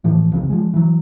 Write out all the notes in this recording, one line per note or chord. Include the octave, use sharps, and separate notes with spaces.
A2 E3 F3
C2 F2 C#3 C4
F3 G#3
E3 F#3